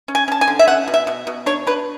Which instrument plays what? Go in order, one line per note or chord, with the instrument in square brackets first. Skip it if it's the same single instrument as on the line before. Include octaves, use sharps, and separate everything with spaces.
[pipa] C#4
G#5
C#4 A5
G#5
D3
E5
C#4 F#5
B2
E5
B2
B2
D4 C#5
D4 B4